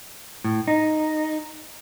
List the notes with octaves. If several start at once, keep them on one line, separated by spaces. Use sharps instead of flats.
A2
D#4